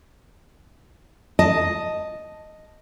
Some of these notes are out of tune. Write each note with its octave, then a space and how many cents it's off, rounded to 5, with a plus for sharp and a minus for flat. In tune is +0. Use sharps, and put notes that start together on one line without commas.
D#5 +0 A5 +0